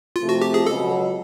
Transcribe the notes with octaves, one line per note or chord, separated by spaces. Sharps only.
F4
C3 F3 A3
F#4
G4
G#4
C#2 B2 F#3 A4